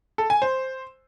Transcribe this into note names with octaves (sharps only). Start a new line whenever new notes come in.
A4
G#5
C5